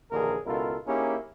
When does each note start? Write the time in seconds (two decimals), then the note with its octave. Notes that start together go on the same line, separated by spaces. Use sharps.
0.11 A#1 D#2 D3 E3 G#4 A#4
0.46 C#2 B2 E4 F4 A4 A#4
0.86 A#3 C#4 D#4 E4 G4 G#4